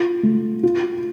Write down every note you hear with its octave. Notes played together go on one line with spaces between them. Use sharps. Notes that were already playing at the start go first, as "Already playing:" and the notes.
Already playing: F4
A3
F4